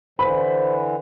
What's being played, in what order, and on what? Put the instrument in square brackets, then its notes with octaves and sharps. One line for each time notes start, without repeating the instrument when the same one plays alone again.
[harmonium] D3 E3 [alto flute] C5 [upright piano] B5